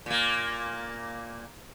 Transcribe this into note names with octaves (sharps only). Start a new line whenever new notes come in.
A#2 A#3